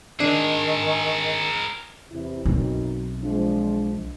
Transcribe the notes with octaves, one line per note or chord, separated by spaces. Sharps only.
D#3 D4 G#4 A#4
E2 C3 E4
B1 F#2 C4 D#4
F3 G#3 D4